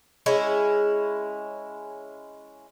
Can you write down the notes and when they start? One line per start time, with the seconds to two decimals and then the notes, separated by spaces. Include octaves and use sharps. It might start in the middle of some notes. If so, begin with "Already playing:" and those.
0.26 G#3 C#4 E4